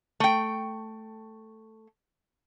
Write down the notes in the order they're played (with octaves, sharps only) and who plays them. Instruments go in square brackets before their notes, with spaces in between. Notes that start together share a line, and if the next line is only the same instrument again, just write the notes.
[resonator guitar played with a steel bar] A3 G5